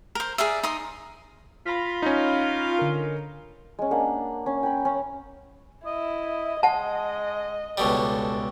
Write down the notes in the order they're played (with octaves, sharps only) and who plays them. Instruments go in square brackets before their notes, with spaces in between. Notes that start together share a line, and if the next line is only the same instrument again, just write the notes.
[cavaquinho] A#4 C5
G#4 A#4 D5 E5
D#4 A#4 C6 D#6
[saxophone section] F4 [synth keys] B5 A#6 B6
[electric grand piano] C#4 D#4
[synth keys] D3 A#4
[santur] G#3 C#4
A#3 D4 F#5
C#4
G5 G#5 B5
C#4
[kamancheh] E4 [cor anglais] D#5
[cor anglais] G#3 [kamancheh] D#5 [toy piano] F#5 A5
[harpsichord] C#2 B2 G3 [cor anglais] A4